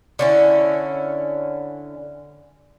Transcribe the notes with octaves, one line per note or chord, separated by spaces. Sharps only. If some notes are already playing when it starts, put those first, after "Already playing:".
D3 C#4 E4